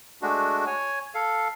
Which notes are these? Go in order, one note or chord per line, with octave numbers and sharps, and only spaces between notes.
G#3 A3 D4 F#4
C#5 G#5
A4 F5